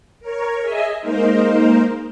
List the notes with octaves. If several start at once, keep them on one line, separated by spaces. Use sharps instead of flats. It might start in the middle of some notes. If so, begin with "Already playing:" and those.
A#4 C#5
G#4 D#5 E5 G#5
G#3 A#3 D#4 A#4 C5